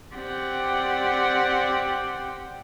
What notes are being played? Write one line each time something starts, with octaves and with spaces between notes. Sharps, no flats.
C4 G4 D5 F#5 G5